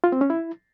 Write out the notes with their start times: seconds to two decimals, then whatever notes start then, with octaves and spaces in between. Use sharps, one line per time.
0.04 F4
0.12 C4
0.21 C#4
0.30 E4